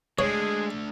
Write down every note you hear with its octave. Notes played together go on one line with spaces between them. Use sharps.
G#3 A3 D4 G#4 C#5